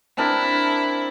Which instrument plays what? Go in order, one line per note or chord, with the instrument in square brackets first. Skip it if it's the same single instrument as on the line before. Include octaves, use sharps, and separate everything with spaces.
[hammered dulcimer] C4 D4 A#4 [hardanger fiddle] E4